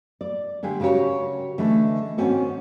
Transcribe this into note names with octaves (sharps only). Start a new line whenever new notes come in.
D5
D3 G#3 G4 G#4
C#3 F#4 G4 A#4 C#5
D3 E3 G#3 A3
G#2 D#3 C4 C#4 F#4